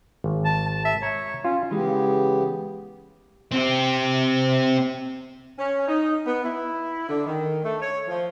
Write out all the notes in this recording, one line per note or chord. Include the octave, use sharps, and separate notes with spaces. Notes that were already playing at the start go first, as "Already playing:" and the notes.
G#1
A5
A5
E5
C#5 A#5
C#4 F4
C#3 E3 G#3 B3 G4
C4 G4
C#4
D#4
B3
E4
D3
D#3
A3
C#5
F3